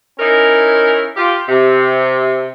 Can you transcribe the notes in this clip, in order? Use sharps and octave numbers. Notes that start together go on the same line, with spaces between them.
C#4 D#4 E4 A#4
F4 G4
C3